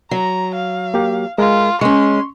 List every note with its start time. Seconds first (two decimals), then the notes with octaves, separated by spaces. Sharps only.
0.11 F#3 A#5
0.55 F5
0.94 A#3 G4
1.38 G#3 F4 A#4
1.81 G#3 C#4 C6 C#6